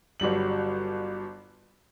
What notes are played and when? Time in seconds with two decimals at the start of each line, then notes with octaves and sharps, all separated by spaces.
0.20 G1 F#3 G3 F#7